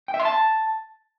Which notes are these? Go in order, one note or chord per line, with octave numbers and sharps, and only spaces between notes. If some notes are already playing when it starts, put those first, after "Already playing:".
G5
E5
C6
A5